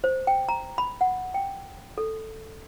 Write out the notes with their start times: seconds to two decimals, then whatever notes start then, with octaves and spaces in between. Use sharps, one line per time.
0.04 C5
0.27 G5
0.49 A#5
0.78 B5
1.01 F#5
1.34 G5
1.98 A4